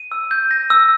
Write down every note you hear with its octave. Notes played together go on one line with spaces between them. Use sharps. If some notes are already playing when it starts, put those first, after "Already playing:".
Already playing: D#7
E6
G6
A#6
E6